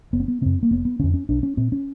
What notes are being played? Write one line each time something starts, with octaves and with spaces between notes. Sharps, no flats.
F#1 B3
C4
B3
F#2 C#3 C4
A#3
F1 B3
B3
F2 D3 C#4
C#4
B1 D4
C#4
A#2 C4
C#4